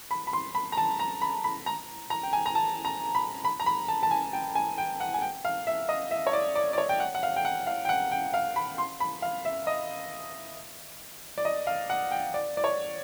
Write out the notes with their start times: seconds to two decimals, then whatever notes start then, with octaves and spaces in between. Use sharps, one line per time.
0.11 B5
0.27 B5
0.33 C6
0.55 B5
0.72 A#5
0.77 A5
1.00 A#5
1.22 B5
1.44 B5
1.66 A#5
2.10 A#5
2.23 G5
2.33 G#5
2.46 A#5
2.55 A5
2.85 A#5
3.15 B5
3.45 B5
3.60 A#5
3.66 B5
3.88 A5
4.03 A5
4.11 G#5
4.33 G5
4.55 G#5
4.78 G5
5.00 F#5
5.14 G#5
5.22 G5
5.45 F5
5.67 E5
5.89 D#5
6.11 E5
6.27 C#5
6.33 D5
6.56 D5
6.73 D5
6.78 C#5
6.89 G5
7.00 F#5
7.15 F#5
7.23 F5
7.36 G5
7.45 F#5
7.67 F5
7.85 G5
7.89 F#5
8.12 G5
8.34 F5
8.56 B5
8.78 C6
9.00 B5
9.22 F5
9.45 E5
9.67 D#5
11.38 D5
11.45 D#5
11.67 F5
11.90 F#5
12.11 G5
12.34 D5
12.57 D5
12.64 C#5